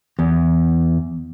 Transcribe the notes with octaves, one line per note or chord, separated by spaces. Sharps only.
E2